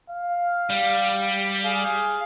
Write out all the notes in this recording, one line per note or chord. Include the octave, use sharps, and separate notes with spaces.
F5
G3
G#4 F5